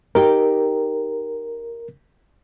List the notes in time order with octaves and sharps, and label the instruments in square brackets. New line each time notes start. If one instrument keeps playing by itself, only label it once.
[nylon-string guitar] D#4 G4 [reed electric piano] A#4